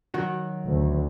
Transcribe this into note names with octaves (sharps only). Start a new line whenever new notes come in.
D#3 F#3 F#4
D2